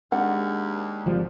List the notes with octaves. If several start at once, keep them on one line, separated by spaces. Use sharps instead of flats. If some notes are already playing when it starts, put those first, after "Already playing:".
D#2 G#3 D4 G#4 F#5
G#1 F3 G3